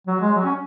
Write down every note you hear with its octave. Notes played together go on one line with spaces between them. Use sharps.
F#3
G#3
F#3
C#4